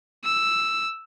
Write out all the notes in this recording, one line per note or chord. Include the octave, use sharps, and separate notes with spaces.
E6